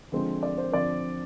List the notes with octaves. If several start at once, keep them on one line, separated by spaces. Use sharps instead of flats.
D3 F3 G#3 C4
D5
C5
D3 F3 C4 D5